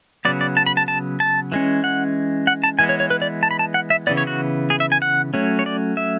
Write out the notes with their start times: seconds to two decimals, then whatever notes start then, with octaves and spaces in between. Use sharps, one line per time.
0.25 C#3 F#3 B3 D5
0.41 D5
0.57 A5
0.66 B5
0.77 A5
0.88 A5
1.20 A5
1.52 E3 G#3 C#4
1.84 F#5
2.47 F#5
2.64 A5
2.79 E3 G#3 B3 G#5
2.89 C#5
3.00 C#5
3.10 B4
3.22 D5
3.43 A5
3.51 B5
3.59 A5
3.74 F#5
3.90 E5
4.07 C#3 E3 B3 D5
4.17 C#5
4.27 F#4
4.70 G#4
4.80 E5
4.92 G#5
5.02 F#5
5.34 F#3 A3 C#4
5.59 C#5
5.66 D5
5.97 E5